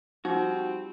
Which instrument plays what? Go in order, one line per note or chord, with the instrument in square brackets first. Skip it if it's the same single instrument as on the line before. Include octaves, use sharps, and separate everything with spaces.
[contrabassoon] F3 [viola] G3 C4 [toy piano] D#4 [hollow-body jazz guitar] F#4